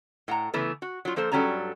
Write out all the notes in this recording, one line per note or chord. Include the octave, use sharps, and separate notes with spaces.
A2 F#5 A#5
C#3 E3 A3 B3
F#4
F#3 F4
F3 A#3 A4 C5
G2 F#3 G3 C#4 A4 A#5